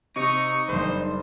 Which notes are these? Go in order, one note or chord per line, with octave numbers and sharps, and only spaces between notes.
C3 D#4 C#6
F#1 G2 C5